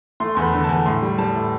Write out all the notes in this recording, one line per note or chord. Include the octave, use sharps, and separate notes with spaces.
A3 C6
E2 C6
B5
D3
A5
E2
A2 C6
G3
G3 A5
A2